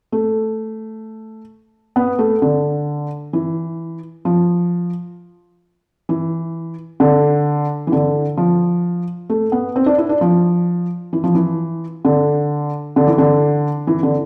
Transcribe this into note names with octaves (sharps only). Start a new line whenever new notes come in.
A3
B3
A3
D3
E3
F3
E3
D3
E3
D3
F3
A3
B3
C4
D4
E4
D4
F3
E3
F3
E3
D3
D3
E3
D3
E3
D3